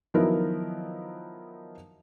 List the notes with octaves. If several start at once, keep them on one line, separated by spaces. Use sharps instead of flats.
D#3 F3 F#3 B3 E4 A#4